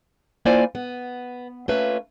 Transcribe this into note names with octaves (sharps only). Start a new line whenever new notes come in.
A#3 E4 F4 C5 D5 G#5
B3
A3 A#3 C#4 F4 B4 E5